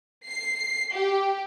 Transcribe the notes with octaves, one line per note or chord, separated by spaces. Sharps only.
C7
G4